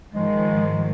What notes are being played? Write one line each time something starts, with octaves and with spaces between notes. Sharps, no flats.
G#2 D#3 F3 G#3